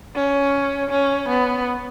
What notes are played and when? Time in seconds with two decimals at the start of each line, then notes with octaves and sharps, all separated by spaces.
0.16 C#4
0.90 C#4
1.29 B3